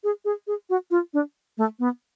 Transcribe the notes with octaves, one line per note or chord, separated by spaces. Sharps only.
G#4
G#4
G#4
F#4
F4
D4
A3
B3